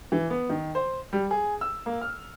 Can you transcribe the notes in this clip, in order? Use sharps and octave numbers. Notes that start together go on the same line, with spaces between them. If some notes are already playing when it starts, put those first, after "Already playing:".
E3
B3
D#3
C5
G3
G#4
E6
A#3
F6